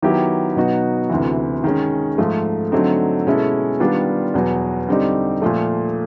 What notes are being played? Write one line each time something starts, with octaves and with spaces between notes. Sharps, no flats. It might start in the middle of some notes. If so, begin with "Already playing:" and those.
D#3 F#3 B3 E4 G4
B2 F#3 B3 D#4 F#4
D2 C3 E3
D#3 G#3 C#4
G#2 F3 A3
D3 F#3 A3 C4 D#4
B2 G#3 C#4 E4 A4
D#3 G3 B3 D4 F4
E2 B2 F#3 B3
D3 G3 C4 D#4 G4
A#2 F3 A3